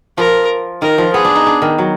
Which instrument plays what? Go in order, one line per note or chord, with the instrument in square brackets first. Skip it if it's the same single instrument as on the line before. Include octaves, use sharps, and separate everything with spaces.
[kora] F3 [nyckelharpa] A#4
[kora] D#3 [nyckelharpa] A#4
[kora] F3
[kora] B3 [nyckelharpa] G#4
[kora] D4
D#4
D4
D#3
F#3